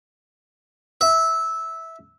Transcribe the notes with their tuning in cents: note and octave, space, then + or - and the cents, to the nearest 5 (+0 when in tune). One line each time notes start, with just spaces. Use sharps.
E5 -15